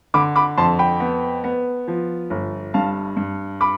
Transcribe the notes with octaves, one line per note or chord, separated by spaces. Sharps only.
D3 B5 D6
B5 D6
F2 A5 C6
G5 B5
B3
B3
F3
G1
G2 F5 A5
G2
B5 D6